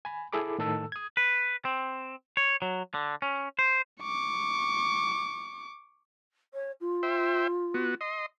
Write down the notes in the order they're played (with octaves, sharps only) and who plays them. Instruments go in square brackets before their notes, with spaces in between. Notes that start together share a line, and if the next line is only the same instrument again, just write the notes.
[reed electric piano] G#5 B5
E4 G#4 A4 B5 D6
A2 D#3 A4 A5 E6
D#6 G#6
[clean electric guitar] B4
C4
C#5
F#3
D3
C#4
C5
[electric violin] C#6 D6
[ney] C#5
F4
[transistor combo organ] C5 E5 G5
B3 F#4
D#5 C6